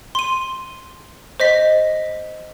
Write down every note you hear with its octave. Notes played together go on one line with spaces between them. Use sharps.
C6 D#7
C5 D#5 B6